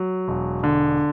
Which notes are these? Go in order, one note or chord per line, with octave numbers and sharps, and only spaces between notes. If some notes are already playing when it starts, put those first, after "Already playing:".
Already playing: F#3
E1
D3